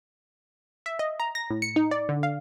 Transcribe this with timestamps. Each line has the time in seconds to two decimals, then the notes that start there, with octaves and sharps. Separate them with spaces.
0.86 E5
0.99 D#5
1.20 A#5
1.35 A#6
1.50 A2
1.62 C#7
1.76 D#4
1.91 D5
2.09 D3
2.23 F5